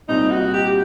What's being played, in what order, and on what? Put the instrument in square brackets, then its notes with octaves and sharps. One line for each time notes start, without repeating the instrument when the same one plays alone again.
[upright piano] C2 A#2 G3 C4 [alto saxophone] D#4
[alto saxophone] F#4
G4